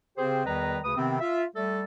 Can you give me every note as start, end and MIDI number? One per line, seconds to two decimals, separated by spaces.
0.18 0.46 49
0.18 0.46 60
0.18 0.46 67
0.18 0.46 68
0.18 0.46 72
0.46 0.79 40
0.46 0.79 51
0.46 0.79 55
0.46 0.79 71
0.46 0.79 75
0.46 0.79 82
0.85 0.95 38
0.85 0.95 49
0.85 0.95 71
0.85 0.95 87
0.97 1.21 48
0.97 1.21 51
0.97 1.21 59
0.97 1.21 60
1.21 1.44 65
1.21 1.44 76
1.56 1.83 55
1.56 1.83 57
1.56 1.83 69